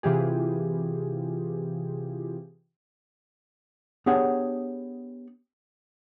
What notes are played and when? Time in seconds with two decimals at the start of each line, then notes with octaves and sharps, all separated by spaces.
0.03 C3 E3 F4 G4 G#4
4.06 B3 D4 G4 G#4 C#5 F#5